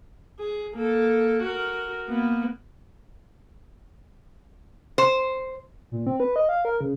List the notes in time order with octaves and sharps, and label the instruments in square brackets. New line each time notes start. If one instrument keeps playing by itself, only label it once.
[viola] G#4
A#3 A4
F#4 A#4
A#3 B3
[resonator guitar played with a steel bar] C5
[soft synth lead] A#2
C4
B4
D#5
F5
A#4
C#3